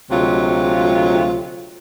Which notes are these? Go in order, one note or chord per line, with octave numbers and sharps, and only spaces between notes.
D2 C3 F#3 G#3 F4